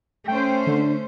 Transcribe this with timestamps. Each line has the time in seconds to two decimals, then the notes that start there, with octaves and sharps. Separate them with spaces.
0.28 A3 C#4 C5 G5
0.67 D3